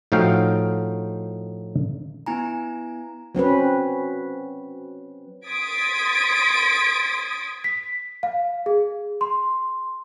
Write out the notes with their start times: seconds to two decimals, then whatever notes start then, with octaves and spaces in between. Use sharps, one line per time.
0.12 A2 F3 D#4 F#4 F5 G5
2.26 B3 E4 G#5 A#5
3.35 F#3 C4 C#4 B4
5.46 C6 D#6 G#6 A6 B6 D7
7.64 B6
8.23 F5
8.66 G#4
9.21 C6